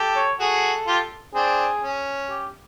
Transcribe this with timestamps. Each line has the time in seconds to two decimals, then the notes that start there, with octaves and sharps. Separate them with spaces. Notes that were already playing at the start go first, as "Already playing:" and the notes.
Already playing: G4 A4
0.16 C#5
0.40 F#4 G#4 A4
0.87 F4 G4
1.34 C4 D4 G#4
1.83 C#4
2.30 G4